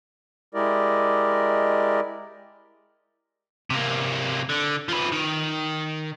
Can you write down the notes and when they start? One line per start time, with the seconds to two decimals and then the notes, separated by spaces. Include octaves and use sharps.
0.55 G#3 E4 G4 A#4 D5 D#5
3.70 C3 A#3
4.49 D3
4.89 F3 B4
5.12 D#3